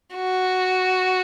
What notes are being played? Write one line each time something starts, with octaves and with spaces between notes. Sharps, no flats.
F#4